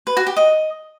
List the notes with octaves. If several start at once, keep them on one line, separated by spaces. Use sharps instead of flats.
B4
F#4
G4
D#5